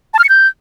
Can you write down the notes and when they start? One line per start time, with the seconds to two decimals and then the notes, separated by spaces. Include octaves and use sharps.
0.14 A5
0.19 F6
0.24 C#7
0.29 G6